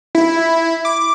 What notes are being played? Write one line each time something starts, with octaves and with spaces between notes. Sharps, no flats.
E4
D6